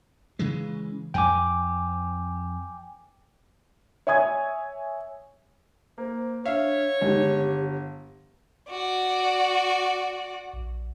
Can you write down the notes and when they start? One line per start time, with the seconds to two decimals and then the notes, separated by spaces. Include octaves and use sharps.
0.39 C#3 E3 G#3
1.14 F2 G5 G#5 D6
4.07 C#5 E5 G#5 D#6 G#6
5.98 A#3 C5
6.45 D4 C#5 E5 F5
7.01 G1 D#3 G#3 G4
8.70 F#4 D5
10.53 A#1